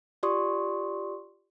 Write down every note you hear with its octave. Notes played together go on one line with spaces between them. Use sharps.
F4 G4 D5 C6 C#6 D#6